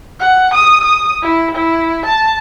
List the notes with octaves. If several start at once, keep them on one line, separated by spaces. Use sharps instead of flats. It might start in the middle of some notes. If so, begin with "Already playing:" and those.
F#5
D#6
D#6
E4
E4
A5